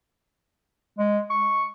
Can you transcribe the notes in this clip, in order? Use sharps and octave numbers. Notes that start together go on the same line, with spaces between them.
G#3
C#6